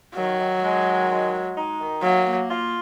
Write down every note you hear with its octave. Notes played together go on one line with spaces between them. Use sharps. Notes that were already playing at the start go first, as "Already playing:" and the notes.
D#3 F#3
D#3
G#3
D#3
G#3
G#3
D#4
D#3
F#3 A#3
A#3
F4